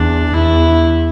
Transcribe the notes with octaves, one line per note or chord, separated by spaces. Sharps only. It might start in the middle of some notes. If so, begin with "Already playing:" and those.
Already playing: E2 D4
E2 E4